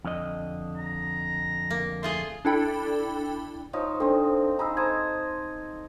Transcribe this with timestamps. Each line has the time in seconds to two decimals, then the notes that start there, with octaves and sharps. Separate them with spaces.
0.05 F2 D3 D#5
0.77 A#5
1.70 A#3
2.03 A3 F4 G#4 C6
2.45 D4 E4 A4 G5 B5
3.73 F3 D#4 C#5
4.00 C4 D4 A4
4.59 D#4 G#4 A#5 B5 E6
4.77 A4 C5 D#5 G#6